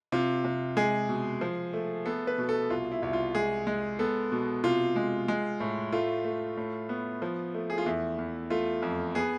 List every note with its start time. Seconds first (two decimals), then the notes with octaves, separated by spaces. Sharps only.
0.12 C3 F4
0.44 C3
0.77 G#3 G#4
1.09 B2
1.41 F3
1.73 A3
2.06 B3 A4
2.27 B4
2.38 B2
2.49 A4
2.70 C2 F4
2.92 E4
3.02 C2
3.13 F4
3.35 G#3 G#4
3.67 G#3
3.99 B3 A4
4.32 B2
4.64 C3 F4
4.96 G#3
5.28 G#3
5.60 A2
5.92 A3 F4
6.24 A3
6.57 A2
6.89 B3
7.22 F3
7.54 A3
7.70 G#4
7.78 F4
7.86 E2 E4
8.18 E2
8.50 A3 F4
8.82 F2
9.15 B3 G#4